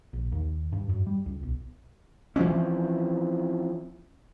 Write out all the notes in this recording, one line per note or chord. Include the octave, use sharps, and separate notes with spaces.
A#1
D#2
G2
F#2
G3
C#2
B1
E3 F3 C4 C#4